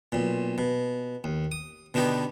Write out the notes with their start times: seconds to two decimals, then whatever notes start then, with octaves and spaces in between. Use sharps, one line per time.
0.12 B1 A#2
0.58 B2
1.24 D#2
1.52 D#6
1.94 B2 D3 B3 D#4 G4